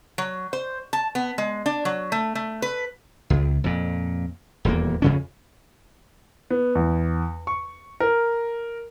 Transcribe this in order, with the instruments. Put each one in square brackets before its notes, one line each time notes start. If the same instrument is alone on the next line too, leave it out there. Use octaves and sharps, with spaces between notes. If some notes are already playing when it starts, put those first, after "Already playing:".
[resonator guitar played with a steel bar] F#3
C5
A5
B3
G#3
D4
F#3
A3
A3
B4
[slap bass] C#2
F2 A#2
D#1 E2 A#3
F2 C#3 C#4
[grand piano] B3
E2
C#6
A#4